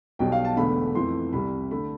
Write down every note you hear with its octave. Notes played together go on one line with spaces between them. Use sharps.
B1 B2 G3 G5
F5
A5
E1 E2 D3 A3 B5
F2 E3 A3 C6
C2 C3 G3 B5
D3 A3 B5